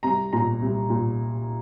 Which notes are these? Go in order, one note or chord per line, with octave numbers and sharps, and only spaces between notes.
C2 A#5
A#2 A#5
C2
A#2